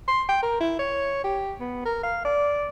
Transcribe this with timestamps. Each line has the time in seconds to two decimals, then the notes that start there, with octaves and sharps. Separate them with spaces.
0.08 C6
0.29 G5
0.43 A#4
0.61 E4
0.79 C#5
1.24 G4
1.60 B3
1.85 A#4
2.03 F5
2.25 D5